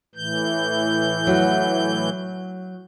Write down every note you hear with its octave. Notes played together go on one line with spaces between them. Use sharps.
A2 E3 G6
F#3